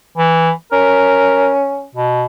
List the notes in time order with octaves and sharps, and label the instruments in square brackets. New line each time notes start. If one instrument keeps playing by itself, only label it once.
[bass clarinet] E3
[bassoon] C#4 [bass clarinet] A#4
[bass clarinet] B2